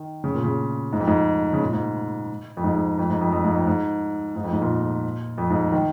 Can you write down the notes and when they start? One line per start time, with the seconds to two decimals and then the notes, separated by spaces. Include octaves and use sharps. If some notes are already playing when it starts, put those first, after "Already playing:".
Already playing: D#3
0.24 C#3
0.34 A#2
0.44 C#3
0.93 G#2
1.00 F2
1.07 G#2
1.53 C#3
1.61 A#2
1.73 G#2
2.57 F2
2.64 G#2
2.76 G#2
2.99 F2
3.10 G#2
3.21 F2
3.32 F2
3.44 G#2
3.56 F2
3.67 G#2
4.36 G#2
4.44 F2
4.53 G#2
4.62 A#2
5.38 F2
5.50 G#2
5.72 D#3